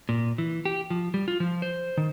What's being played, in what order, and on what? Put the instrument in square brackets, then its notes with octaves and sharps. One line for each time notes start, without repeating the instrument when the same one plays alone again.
[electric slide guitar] A#2
E3
G4
F3
G3
F4
F3
C5
D#3